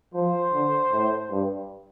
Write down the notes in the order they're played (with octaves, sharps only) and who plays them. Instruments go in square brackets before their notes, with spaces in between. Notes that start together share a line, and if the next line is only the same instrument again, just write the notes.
[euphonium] F3 [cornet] C5
[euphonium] D3
A2
G2